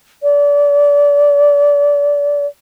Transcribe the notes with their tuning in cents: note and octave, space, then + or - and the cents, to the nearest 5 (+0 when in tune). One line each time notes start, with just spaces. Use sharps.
D5 -30